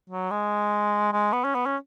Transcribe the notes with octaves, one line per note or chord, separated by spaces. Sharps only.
F#3
G#3
G#3
B3
C#4
B3
C#4